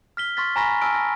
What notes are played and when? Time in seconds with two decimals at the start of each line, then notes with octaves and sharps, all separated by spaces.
0.17 F6 B6 G7
0.37 C6 C#6 F6 A6 B6
0.56 G#5 A#5 B5 C#6 A#6 B6
0.81 G#5 A5 E6 F6 D7
0.95 A#6